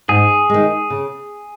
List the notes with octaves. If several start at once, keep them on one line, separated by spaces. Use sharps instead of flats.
G#2 G#4
D#3 G#3
C#3